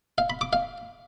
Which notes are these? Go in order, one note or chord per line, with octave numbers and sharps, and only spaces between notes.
F5
B5
D6
F5